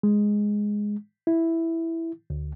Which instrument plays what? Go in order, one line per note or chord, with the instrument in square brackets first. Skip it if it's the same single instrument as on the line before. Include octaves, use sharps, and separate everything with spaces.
[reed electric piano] G#3
E4
D2